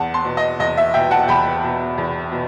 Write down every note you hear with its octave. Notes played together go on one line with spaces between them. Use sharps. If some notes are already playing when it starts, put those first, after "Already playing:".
Already playing: E2 F#5 A5
A5 C6
B2
D#5
E2 D#5
E5
B2 E5 G5
F#5 A5
E2 G5 B5
B2
E2
B2